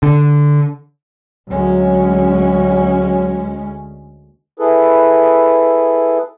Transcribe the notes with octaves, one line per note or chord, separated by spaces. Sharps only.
D3
D2 F#3 G#3 C#4
E4 G#4 A4 B4